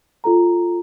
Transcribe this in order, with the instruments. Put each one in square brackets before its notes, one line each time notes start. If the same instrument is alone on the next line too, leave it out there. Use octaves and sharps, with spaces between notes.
[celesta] F4 A4 A#5